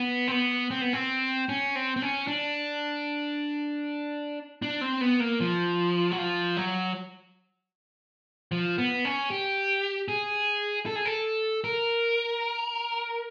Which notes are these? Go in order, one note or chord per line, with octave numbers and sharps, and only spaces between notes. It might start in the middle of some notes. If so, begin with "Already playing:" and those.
Already playing: B3
C4
B3
C4
B3
C4
C#4
C4
C4
C#4
D4
D4
C4
B3
A#3
F3
F#3
F3
F#3
F3
B3
C#4
G4
G#4
A4
G#4
A4
A#4